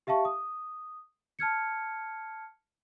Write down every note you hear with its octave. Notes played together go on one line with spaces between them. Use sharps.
G4 E5 F5 A5 C#6
D#6
A5 F6 G#6 C#7